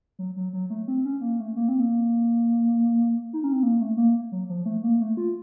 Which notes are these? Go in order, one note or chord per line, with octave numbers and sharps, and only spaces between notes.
F#3
F#3
F#3
A3
C4
C#4
A#3
A3
A#3
C4
A#3
D#4
C#4
C4
A#3
A3
A#3
F#3
F3
A3
A#3
A3
F4